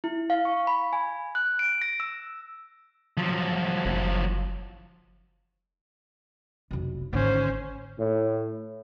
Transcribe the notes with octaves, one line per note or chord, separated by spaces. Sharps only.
E4
F5
C#6
B5
G#5
F#6
D7
A#6
E6
F3 F#3
F#1
F1 B1
G#1 D2 C#4 C5
A2